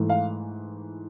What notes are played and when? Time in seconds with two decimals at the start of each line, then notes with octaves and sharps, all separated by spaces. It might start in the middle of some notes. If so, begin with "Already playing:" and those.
Already playing: G#2 E3 A3
0.09 F5